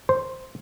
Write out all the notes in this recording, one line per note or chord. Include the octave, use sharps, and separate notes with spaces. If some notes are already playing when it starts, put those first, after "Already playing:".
C5